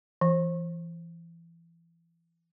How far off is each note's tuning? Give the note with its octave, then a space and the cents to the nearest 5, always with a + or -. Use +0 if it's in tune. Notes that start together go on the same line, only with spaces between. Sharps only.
E3 +30